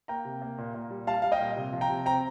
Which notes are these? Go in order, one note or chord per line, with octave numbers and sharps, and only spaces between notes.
A#3 G5 A#5
C3
A#3
A#2
A#2
G3
G3 F5 A5
G3 F5
D#5 G5
A#2
C3
F3
G5 A#5
C3
C4 G5 A#5